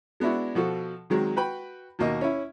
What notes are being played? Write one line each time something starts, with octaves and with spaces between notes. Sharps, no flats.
G#3 B3 D4 E4 F#4
B2 F3 F#4 A4
D#3 F#3 G#3 C4
F#4 B4 G5 B5
D#2 B2 A#3 D#5
C#4 E4